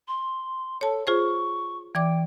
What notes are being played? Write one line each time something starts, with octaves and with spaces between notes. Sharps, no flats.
C6
A4 C#5 A5
F4 G#4 C5 C#6
E3 D5 G5 D6